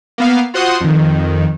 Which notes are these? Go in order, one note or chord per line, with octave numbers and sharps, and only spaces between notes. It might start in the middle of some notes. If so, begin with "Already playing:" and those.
A#3 B3 F5
F4 F#4 C5 F#5 C6 D#6
F2 D#3